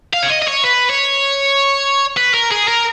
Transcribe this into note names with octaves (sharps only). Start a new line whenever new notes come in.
F5
C#5
D#5
D#5
C#5
B4
C#5
B4
A#4
G#4
A#4